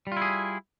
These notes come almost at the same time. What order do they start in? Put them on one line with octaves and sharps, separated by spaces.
G3 F4 E4 G#4